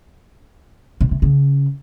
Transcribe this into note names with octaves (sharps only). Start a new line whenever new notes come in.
B2
C3
C#3